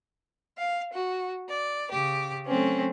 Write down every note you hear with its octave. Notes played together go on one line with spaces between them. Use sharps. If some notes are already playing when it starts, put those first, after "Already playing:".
F5
F#4
D5
C#3 G4 D6
F#3 A3 C4 C#4